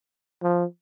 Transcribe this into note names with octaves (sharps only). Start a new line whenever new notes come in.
F3